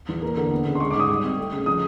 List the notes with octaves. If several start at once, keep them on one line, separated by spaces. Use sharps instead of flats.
E2
A#3
D3
B3
C#3
C6
G#3 C#6
D6
G#2
D#6
G3
C4
A3
C#3
F3 D#6